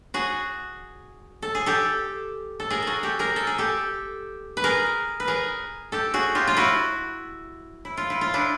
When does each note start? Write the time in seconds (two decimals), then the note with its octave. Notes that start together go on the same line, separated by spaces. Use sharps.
0.14 F#4 G#4
1.42 A4
1.55 G#4
1.66 G4 A4
2.60 A4
2.70 G#4 A#4
2.82 F#4 G#4 A4
3.03 G4 A4
3.19 G#4 A#4
3.36 A4
3.47 G#4
3.58 G4 A4
4.57 B4
4.64 G#4 A#4
5.20 B4
5.28 G#4 A#4
5.92 G4 A4
6.14 F#4 G#4
6.35 F4 G4
6.47 F4
6.57 E4 F#4
7.85 E4
7.97 F4
8.10 E4
8.21 F4
8.34 D4 E4